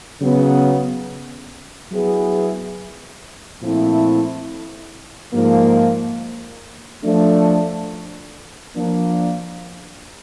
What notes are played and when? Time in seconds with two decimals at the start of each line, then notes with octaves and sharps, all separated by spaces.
0.20 C#3 F#3 B3
1.91 F#3 B3 E4 G#4
3.62 A#2 F3 A3 C4 E4
5.33 G#2 F3 A#3
7.04 F3 A3 D4
8.75 F3 A#3 D4